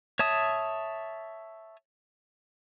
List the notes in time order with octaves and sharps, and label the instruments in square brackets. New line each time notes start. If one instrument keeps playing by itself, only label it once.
[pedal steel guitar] C#5 E5 A5 D#6